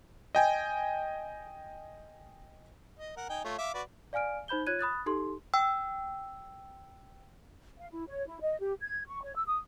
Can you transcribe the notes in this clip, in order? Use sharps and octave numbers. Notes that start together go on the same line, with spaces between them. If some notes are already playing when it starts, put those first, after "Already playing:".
D#5 G5 G#5
D#5
A#4 F#5
D#4 G5 G#5
A3 F4 C#5
E5 F5 D6
F#4 B4 D5
D5 F5 G#5 F6 D7
D#4 C5 B5 G6 G7
F4 C#5 F#6 G#6 D#7
B5 D#6 F#6 A6
D#4 G4 A4 C6
G5 E6
F5
E4
C#5
E4
D#5
G4
G#6
C#6
C#5
E6
D#6